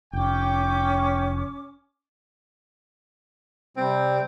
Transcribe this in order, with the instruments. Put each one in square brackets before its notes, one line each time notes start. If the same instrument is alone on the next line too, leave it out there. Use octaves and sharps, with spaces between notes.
[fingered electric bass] F1 [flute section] C#4 D6 [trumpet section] G5
[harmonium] C3 G3 [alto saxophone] C4